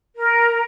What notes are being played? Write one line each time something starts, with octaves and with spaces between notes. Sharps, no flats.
A#4